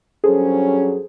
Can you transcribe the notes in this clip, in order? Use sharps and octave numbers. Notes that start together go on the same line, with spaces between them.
G2 F#3 C#4 G#4 A4 C5